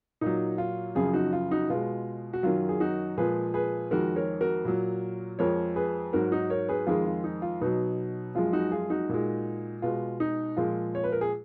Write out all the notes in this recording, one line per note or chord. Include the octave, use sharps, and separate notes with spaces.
A#2 F#3 D#4
F4
F#2 C#3 F3 F4 G#4
D#4 F#4
F4
D#4 F#4
B2 G#3 F4
F#4
F#2 D#3 F#3 F4
G#4
D#4 F#4
A#2 F3 G#3 G#4 B4
G#4 B4
F2 D#3 G#3 F#4 A#4
A#4 C#5
F#4 A#4
A#2 F#3
F2 F3 G#3 A#4 C#5
G#4 B4
G#2 F#3 F#4 A#4
D#4 F#4
A#4 C#5
G#4 B4
F2 D#3 G#3 F4 G#4
F4
D#4
F4
B2 F#3 D#4
F#2 F3 G#3 F4
D#4 F#4
F4 G#4
D#4 F#4
A#2 G#3
B2 G#3 F4
D#4
A#2 F3 G#3 F4
C#5
B4
A#4
G#4